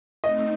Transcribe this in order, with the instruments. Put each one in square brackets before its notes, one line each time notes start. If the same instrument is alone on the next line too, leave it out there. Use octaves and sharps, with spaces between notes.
[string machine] A3 C4 D#4 [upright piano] D#5